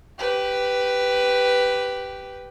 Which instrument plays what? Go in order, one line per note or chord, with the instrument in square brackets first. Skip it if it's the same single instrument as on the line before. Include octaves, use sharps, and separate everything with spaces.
[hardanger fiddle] G4 B4